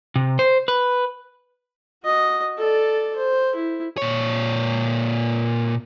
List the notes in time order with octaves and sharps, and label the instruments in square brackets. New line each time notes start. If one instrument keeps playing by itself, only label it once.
[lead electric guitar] C3
C5
B4
[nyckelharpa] F#4 D#5
A4 D5
C5
E4
[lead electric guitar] A#2 C#5